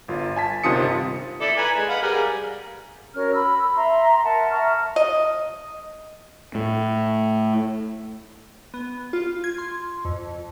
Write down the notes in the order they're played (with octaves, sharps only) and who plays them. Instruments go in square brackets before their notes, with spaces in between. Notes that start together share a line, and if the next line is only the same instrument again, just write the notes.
[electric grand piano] G1 F4
G#5 A5 B6
G1 C3 D#3 F4 D#6 C#7
[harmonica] E4 A4 D5
B4 G#5 A#5
G#3
B4 F5 F#5
G3 G#4 A#4
[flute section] C#4 F#4 A#4 F6
B5 E6
E5 A#5 C6
A#4 E5 F#5 A5
E5 A#5 C#6 F6
[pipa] D#5
[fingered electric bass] A2
[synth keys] B3
F4
G#6
C6
F2